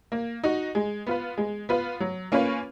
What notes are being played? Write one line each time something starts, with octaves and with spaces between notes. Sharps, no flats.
A#3
D#4 F#4
G#3
B3 F4 B4
G#3
B3 F4 B4
F#3
A#3 C#4 F4 B4